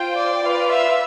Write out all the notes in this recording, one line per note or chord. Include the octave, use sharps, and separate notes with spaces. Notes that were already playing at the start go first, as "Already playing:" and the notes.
Already playing: F4 C5 G5
D5
F4 B4 F5
E5